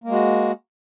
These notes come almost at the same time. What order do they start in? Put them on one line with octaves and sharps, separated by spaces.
A#3 G#3 F#4